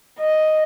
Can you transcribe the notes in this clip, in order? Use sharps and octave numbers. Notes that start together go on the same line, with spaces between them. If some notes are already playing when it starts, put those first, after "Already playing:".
D#5